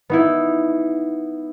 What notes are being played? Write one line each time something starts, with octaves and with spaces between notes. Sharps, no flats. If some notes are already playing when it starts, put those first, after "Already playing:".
B3 D#4 E4